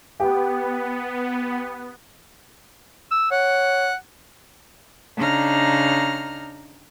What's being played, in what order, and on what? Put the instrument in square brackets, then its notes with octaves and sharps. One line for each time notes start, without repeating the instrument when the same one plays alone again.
[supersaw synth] B3 [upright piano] G4
[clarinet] E6
[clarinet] C#5 [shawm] F#5
[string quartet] C#3 D4 D#4 A#5 F6